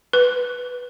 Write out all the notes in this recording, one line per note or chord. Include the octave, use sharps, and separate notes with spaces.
B4